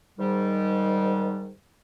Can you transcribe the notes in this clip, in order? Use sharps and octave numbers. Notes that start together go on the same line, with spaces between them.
G#2 D#3 G3